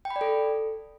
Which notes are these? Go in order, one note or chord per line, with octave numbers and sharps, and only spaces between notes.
G5
B5
D5
A4